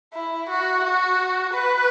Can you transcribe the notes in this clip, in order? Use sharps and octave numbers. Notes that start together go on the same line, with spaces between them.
E4
F#4
F#4
B4